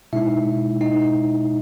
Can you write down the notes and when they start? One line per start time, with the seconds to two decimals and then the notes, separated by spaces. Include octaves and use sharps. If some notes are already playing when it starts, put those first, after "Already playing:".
0.13 B2 G#3 D#4 E4 E5
0.81 D#4 D#5